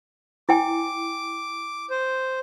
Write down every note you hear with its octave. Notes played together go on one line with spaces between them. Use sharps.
E4 G5 G#5 D6
C5